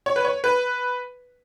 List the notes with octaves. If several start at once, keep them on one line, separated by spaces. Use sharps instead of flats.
C#5
B4
C#5
B4